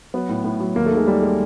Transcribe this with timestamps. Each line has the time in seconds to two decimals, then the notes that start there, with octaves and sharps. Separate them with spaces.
0.14 F#3 B3
0.29 A2
0.44 A2
0.60 F#3
0.76 D#2 A#3
0.86 A3
0.91 D#3
0.97 G#3
1.07 F#3 G3
1.22 G#3